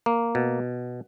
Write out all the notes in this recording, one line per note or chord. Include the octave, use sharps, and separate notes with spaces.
A#3
B2